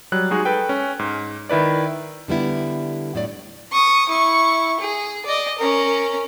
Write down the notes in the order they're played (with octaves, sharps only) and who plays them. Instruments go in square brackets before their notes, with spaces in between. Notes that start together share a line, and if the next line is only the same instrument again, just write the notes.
[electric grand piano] F#3 G3 F#6
G#3 D#4 F#4 G#4
A4 B4 G5
C#4
G#2
D#3 E4 B4 D5
[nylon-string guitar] D3 G3 B3 E4
A2 F#3 D5
[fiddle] C#6 D#6
E4 C#6
G#4
D5 D#5
C#4 A#4